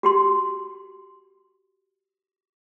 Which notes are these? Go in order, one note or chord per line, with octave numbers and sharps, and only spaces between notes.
F#4 G4 C6